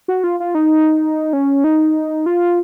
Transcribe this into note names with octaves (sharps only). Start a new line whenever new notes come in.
F#4
F4
F4
D#4
C#4
D#4
F4